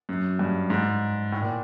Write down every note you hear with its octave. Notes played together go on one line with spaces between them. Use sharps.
F#2
G2
G#2
A2
A#2